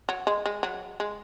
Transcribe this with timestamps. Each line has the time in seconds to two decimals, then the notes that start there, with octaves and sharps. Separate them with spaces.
0.09 F#3
0.27 G#3
0.46 G#3
0.63 F#3
1.00 G#3